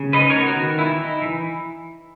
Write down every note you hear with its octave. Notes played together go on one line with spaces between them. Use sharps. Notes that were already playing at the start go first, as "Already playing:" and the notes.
Already playing: C#3
D#4 B4 D#5
A#4 C#5
B3
F#4
D#3
E3 E4
D#4
E3